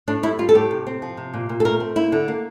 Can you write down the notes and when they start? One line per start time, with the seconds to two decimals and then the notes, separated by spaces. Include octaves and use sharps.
0.08 A2 D4
0.23 G3 E4
0.39 G3 F4
0.49 A4
0.55 A2 G4
0.71 C3
0.87 C4
1.02 F3
1.17 C3
1.34 A#2
1.49 A#2
1.60 A4
1.65 A3 A#4
1.80 C4
1.96 A#3 E4
2.12 D3
2.28 A#3